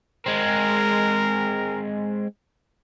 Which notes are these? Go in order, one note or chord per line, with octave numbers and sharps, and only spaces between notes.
G#3 C4 A#4